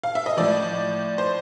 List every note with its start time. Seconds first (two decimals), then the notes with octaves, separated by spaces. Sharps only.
0.03 F5
0.15 E5
0.26 D#5
0.37 A2 F3 D5
1.18 C5